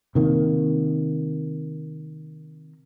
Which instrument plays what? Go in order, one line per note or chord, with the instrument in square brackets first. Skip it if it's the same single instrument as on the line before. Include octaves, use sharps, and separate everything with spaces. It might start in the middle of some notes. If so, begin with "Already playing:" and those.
[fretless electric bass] C3 D#3 A#3